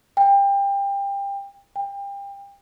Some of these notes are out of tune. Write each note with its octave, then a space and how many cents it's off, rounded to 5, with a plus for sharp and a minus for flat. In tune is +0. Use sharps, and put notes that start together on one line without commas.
G5 +25
G5 +30